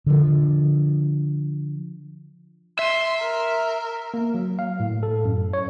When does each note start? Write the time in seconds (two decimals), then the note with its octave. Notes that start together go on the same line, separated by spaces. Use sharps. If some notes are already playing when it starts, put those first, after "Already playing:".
0.06 D3 F3
2.79 E5 C6
3.20 A#4
4.14 A#3
4.34 F#3
4.59 F5
4.80 A2
5.03 A4
5.25 F#2
5.53 C#5